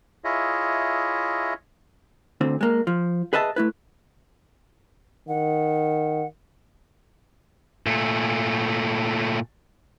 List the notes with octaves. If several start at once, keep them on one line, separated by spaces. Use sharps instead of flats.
E4 F4 G#4 C#5 D#5 E5
D2 D3 C4
G#3 A#3
F3
G#4 B4 D#5 E5 A5
A3 E4 B4
D#3 F#5
A#2 A3